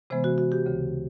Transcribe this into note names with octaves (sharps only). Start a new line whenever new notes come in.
C3 E3 G#3 B3 C5
F#4
F#4
G4
D2 C#3 E3